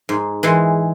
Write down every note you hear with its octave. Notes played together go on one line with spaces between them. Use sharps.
G#2
E3 G#3